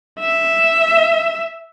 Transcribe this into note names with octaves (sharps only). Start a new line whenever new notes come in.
E5